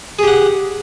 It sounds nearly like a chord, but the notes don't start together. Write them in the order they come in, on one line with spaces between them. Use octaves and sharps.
G#4 G4 F#5